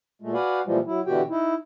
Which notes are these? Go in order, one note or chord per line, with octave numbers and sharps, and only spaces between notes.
A#2 G#3 A3
F#4 B4 D5 F5 F#5 G#5
A#2 E3 F3 G3 G#3
F#3 E4
B2 D3 E3 F#4 G4 G5
D#4 E4